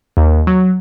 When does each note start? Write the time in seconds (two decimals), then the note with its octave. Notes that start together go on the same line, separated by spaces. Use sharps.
0.17 D#2
0.47 F#3